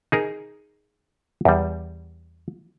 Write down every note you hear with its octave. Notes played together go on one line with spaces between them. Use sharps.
D#4 G#4 A#4
E2 G3